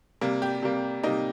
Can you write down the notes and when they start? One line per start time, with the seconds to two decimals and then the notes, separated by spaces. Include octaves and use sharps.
0.21 C3 G3 A#3
0.42 G4
0.62 C3 G3 A#3
1.03 C3 G3 A#3 D#4